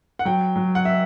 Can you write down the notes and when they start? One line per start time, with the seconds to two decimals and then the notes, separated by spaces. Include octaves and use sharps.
0.19 F#5
0.25 F#3 G5
0.56 F#3
0.75 F#5
0.85 E5